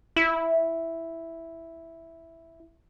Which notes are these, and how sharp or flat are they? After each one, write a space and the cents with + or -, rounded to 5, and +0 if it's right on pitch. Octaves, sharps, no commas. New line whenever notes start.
E4 +0